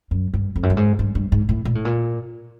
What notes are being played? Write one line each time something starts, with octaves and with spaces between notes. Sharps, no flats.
F#2
G2
F2
F#2
G2
G#2
G2
G2
G#2
A2
A#2
A2
A#2